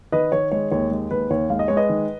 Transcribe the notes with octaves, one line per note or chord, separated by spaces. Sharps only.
D#3 B4 D#5
D#3 C#5
G#3 C#5
D#2 C#5
G#3
D#2 B4
D#2 C#5
G#3 F5
D#5
G#3 C#5
B4 D#5
D#3